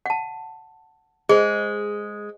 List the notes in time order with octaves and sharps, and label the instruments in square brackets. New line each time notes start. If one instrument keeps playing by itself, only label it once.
[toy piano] F#5 A5
[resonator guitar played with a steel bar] G#3 [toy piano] G#4 C5